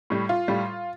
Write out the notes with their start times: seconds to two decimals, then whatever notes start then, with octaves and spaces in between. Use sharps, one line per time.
0.10 A2 G3
0.29 F4
0.48 A2 G3